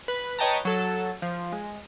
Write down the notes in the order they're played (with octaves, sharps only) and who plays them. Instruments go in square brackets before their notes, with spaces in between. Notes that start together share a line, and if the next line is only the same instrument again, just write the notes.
[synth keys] B4
B4 C#5 D#5 G5 A5 A#5
F#3 A4
F3
G#3